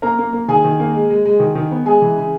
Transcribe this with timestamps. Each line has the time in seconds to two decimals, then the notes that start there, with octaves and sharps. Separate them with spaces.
0.02 A#3 A#4 A#5
0.19 A#3
0.33 A#3
0.48 D#3 G#4 G#5
0.64 D#3
0.80 A#3
0.94 G#3
1.10 G#3
1.25 G#3
1.40 D#3
1.55 D#3
1.71 B3
1.86 G#3 G#4 G#5
2.02 E3
2.16 C#3